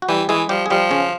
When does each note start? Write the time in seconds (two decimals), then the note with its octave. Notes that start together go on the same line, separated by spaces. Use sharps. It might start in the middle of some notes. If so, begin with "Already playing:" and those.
0.02 F#4
0.09 E3 G3 G4
0.29 E3 G#3 G#4
0.49 F3 G3 G4
0.66 G#4
0.70 F3 G3 G4
0.91 C#3 C#4